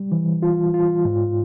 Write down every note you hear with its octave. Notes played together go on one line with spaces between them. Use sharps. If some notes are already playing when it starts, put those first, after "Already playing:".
Already playing: G3
E3
F4
F4
G#2